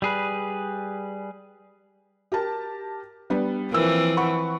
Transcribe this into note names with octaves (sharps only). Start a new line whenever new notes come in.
G3 G#4 B4
G4 A#4 A5
G3 B3 D4
E3 F3 A#3 C4 E6
F#5 B5 C#6